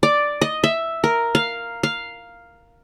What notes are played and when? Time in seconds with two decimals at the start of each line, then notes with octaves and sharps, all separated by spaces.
0.03 D5
0.42 D#5
0.64 E5
1.04 A#4
1.35 F5
1.83 F5